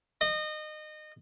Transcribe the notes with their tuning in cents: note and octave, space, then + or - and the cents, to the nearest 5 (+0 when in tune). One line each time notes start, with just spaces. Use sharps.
D#5 -25